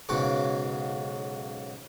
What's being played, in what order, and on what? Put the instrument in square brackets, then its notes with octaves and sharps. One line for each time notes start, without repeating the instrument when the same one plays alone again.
[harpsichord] B1 G#2 C#3 F#4 D6